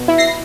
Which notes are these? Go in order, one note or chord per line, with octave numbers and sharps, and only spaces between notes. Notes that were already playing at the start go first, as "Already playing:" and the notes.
Already playing: B2
E4
A#6 C7